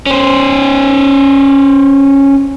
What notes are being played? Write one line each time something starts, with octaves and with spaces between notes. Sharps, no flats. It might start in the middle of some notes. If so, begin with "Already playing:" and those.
C#4 C5